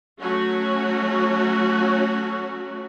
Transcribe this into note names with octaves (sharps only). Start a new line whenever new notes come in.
F#3 A3 C#4 F#4